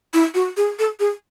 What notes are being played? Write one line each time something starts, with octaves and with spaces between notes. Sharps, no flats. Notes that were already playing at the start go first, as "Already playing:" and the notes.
E4
F#4
G#4
A4
G#4